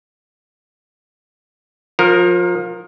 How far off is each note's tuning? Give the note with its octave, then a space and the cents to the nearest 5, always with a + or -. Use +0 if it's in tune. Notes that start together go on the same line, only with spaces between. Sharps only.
F3 +25 A#4 +0